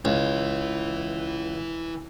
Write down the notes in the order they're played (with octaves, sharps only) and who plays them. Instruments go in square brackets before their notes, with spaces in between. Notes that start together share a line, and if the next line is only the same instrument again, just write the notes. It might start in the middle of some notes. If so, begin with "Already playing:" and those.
[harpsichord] C#2 [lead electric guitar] E3 E4